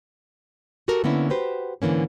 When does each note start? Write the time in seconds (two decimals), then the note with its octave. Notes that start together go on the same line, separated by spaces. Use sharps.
0.88 F#4 G4 A4 A#4
1.04 D3 A#3 B3 C#4 E4
1.30 F#4 G4 B4 C5
1.82 G#2 D3 E3 A#3 C#4